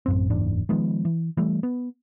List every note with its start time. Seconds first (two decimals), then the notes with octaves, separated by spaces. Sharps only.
0.06 A1 F#2 C4
0.30 F#1 E2 G#2 D4
0.69 D#3 F3 G#3 B3
1.05 E3
1.37 E3 G3 A3
1.63 B3